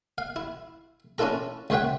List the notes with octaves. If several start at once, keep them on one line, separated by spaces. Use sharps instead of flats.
F5
E4
C#4 D4 E4 F4 A4 A#5
C#2 C5 C#5 E5 F#5 G5